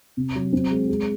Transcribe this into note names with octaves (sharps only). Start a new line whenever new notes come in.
C3
F#3
C4
G#3
G#3